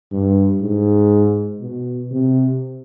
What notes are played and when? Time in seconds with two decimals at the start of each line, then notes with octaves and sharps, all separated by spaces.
0.12 G2
0.62 G#2
1.61 B2
2.11 C3